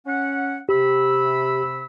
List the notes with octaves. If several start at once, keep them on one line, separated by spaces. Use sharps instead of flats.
C#4 F#5
C3 G4 B5 E6